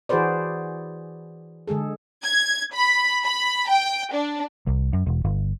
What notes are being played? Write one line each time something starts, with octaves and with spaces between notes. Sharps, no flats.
E3 F#4 G#4 B4 C5 D5
D3 G#3 G#4 A4
G#6
B5
B5
G5
D4
C2
F#2
E1
G1